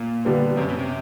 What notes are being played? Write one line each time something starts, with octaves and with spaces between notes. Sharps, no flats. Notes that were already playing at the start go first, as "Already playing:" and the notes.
Already playing: A#2
D3 G3 B3
F#2 C3
B2
C3